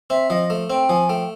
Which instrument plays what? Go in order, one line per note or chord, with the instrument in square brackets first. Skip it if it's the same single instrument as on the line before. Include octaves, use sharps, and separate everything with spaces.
[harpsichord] C4 [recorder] E5
[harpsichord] F3 [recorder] D#5
[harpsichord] A3
[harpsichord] C4 [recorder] G5
[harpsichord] F3 [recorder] G#5
[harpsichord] A3 [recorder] G5